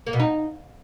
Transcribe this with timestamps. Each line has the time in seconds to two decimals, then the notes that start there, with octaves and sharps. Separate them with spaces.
0.07 A#3
0.13 B2
0.20 D#4